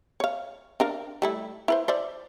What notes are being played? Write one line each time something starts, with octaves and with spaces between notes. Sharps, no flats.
C#5 F5
D4 A#4 F5
G3 A3 E4
E4 B4 C5
C5 D5 E5